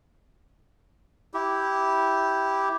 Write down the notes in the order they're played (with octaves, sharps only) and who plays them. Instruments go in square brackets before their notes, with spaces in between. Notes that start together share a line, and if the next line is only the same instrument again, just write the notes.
[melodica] E4 G4